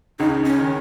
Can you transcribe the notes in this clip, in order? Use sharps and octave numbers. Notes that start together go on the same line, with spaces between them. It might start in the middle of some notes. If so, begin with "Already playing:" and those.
C#2 C#3 D#4
C#4
D#3